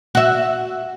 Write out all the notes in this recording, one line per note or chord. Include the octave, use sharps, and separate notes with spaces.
F#4 E5